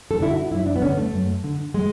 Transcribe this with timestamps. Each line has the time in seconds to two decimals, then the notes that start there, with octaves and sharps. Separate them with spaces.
0.11 A4
0.20 D3 E4
0.31 F#4
0.52 F#2 E4
0.66 D4
0.76 B3
0.82 D3 C#4
0.97 A3
1.13 F#2
1.44 D3
1.74 G#3